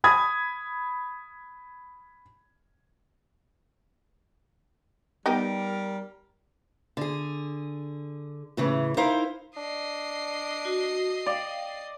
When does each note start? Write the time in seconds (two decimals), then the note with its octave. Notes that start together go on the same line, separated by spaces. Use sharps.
0.04 B5 D#6 G#6
5.26 G3 B3 D#4 G4 A#4
6.97 D3 G#4
8.57 A2 C#3 E3
8.97 D#4 E4 A#4 C5 F5
9.57 D4 D#5 C7
10.65 F#4
11.26 D5 F5 G5